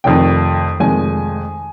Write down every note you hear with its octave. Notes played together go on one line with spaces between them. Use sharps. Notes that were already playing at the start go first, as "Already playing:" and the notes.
F1 F2 D#3 G5
F1 F2 D#3 G#3 G#5